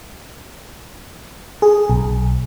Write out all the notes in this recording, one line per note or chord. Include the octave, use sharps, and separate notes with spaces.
G#4
B1